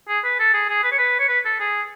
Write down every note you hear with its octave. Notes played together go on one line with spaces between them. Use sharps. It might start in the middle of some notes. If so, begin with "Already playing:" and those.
G#4
B4
A4
G#4
G#4
B4
C#5
B4
C#5
B4
A4
G#4